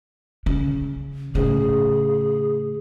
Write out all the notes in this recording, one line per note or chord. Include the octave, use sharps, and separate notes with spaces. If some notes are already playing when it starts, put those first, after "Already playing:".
C#3
A2 C#3 G#4